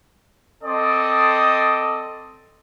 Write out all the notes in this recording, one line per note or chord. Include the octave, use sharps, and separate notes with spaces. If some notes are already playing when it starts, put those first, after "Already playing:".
C4 A4 D5 D#5 D#6